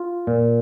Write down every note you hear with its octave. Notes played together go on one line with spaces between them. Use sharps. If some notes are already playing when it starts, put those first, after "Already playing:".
Already playing: F4
A#2